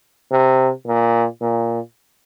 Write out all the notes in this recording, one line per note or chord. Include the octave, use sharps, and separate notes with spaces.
C3
A#2
A#2